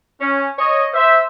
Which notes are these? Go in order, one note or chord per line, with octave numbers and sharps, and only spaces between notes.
C#4
C#5 D#5
C5 E5